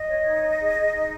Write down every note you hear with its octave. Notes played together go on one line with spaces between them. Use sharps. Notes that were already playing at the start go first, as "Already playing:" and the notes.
Already playing: D#5
C#5
D#4
D#4
G#4
G#4
D#4